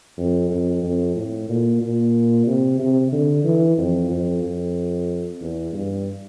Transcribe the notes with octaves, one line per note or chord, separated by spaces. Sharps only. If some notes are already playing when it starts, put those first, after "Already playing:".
F2
F2
F2
A2
A#2
A#2
C3
C3
D3
E3
F2
F2
F2
E2
G2